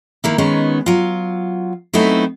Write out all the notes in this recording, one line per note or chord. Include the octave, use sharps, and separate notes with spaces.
D#3 A#3 E4
D#3 G#3 B3 C#4 D#4
F#3 F4
F#3 A3 B3 C4 D#4 E4